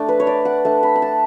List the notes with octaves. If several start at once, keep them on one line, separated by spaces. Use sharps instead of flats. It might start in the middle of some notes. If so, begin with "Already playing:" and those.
Already playing: A3 D4
B4
C#5
D5
F#5
A3 D4 A5
B5
B5
A5